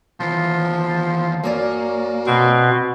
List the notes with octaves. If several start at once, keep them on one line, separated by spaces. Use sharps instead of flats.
D#2 E3 F3
F#2 A#3 C#4 D5
B2 C4